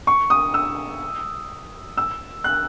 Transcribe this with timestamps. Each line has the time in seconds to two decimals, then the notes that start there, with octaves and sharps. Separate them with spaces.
0.07 C#6
0.30 D#6
0.54 E6
1.97 E6
2.44 F#6